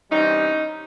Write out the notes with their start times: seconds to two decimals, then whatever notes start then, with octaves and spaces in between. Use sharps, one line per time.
0.10 C3 E3 G3 C#4 D#4